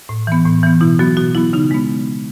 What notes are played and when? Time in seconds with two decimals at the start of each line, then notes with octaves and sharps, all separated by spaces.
0.09 A2
0.27 E3 B3
0.46 A2
0.63 E3 B3
0.81 B2 E4
0.99 F#3 B3 F#4
1.17 B2 F#4
1.35 F#3 B3 E4
1.53 C#3 D#4
1.71 G#3 B3